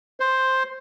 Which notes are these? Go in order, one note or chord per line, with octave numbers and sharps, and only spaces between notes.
C5